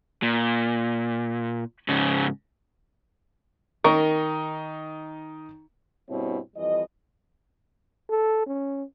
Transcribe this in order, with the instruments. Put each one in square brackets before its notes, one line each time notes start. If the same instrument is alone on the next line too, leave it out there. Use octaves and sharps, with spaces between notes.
[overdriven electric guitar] A#2
G#2 C#3
[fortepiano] D#3 D#4 C#6 [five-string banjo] A#4
[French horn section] G2 B2 G3 C4 E4 C#5
F2 E3 G3 D#5
[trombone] A4
C#4